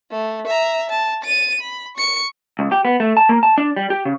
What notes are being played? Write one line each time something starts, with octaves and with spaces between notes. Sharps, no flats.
A3
E5 A#5
A5
A6 D#7
B5
C#6 C#7
C#2
G4
B3
A3
A5
A#3
A5
D4
G3
G4
C#3